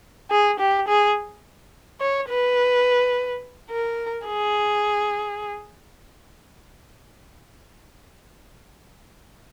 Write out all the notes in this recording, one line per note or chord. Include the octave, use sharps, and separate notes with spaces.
G#4
G4
G#4
C#5
B4
A#4
G#4